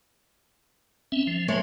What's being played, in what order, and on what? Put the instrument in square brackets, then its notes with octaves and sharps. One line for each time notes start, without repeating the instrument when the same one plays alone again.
[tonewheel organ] C4 C#4 E5
F3
[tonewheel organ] F#3 C5 [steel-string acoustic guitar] G#3 A3 C#5